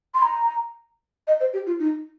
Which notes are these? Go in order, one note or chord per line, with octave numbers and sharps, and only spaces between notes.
C6
A#5
D#5
C5
G4
F4
D#4